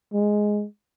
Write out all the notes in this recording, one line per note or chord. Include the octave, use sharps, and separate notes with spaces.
G#3